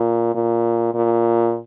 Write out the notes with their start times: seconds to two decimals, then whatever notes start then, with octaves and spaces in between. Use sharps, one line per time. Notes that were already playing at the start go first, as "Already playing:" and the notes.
Already playing: A#2
0.35 A#2
0.94 A#2